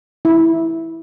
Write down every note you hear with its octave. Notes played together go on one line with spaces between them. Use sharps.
E4